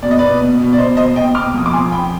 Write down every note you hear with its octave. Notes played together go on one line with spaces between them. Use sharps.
B2 D5
D#5
B2 B4 D5
B2
B2
D5
B2 C5 D#5
B2 C5 D#5
B2 D#5 G5
B2 D6 F6
F2 D#6
D6
F2 G#5 C6
F2 G5 B5